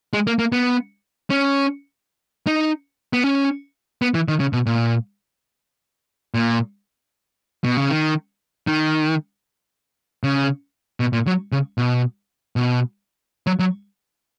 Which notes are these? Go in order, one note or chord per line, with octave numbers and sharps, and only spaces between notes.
G#3
A#3
A#3
B3
C#4
D#4
B3
C#4
B3
E3
D#3
C#3
B2
A#2
A#2
B2
C#3
D#3
D#3
C#3
B2
A#2
F#3
C#3
B2
B2
F#3
F#3